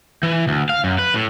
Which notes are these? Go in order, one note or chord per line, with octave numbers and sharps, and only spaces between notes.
E3
D2
F5
F#2
B4
A2